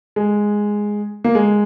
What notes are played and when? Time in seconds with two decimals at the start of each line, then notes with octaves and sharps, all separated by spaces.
0.16 G#3
1.24 A#3
1.35 G#3